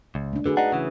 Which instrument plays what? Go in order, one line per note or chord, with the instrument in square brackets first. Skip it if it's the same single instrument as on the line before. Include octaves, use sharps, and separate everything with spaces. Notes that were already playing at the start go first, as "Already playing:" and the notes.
[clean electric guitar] C#2
[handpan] A3 D4
[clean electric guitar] D3 [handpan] F#4 G#4 B4
[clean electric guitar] D4 D#4 [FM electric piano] F#5
[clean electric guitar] C#3 E3